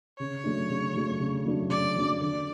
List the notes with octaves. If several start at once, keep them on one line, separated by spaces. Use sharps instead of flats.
C#3 C#5
F#3 A3 D4
C#3
F#3 A3 D4
C#3
F#3 A3 D4
C#3 D5
F#3 A3 D4
D3 D5